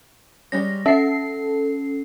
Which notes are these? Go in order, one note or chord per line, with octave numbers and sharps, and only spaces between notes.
G3 G#3 C#4 A#6
C#4 A4 E5 C7